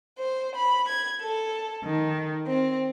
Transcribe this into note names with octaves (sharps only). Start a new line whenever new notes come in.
C5
B5
G#6
A4
D#3
C4